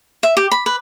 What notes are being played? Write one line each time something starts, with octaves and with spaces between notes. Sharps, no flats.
E5
G4
B5
B4